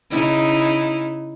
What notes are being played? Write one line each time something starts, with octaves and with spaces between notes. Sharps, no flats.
C#3 D#4 E4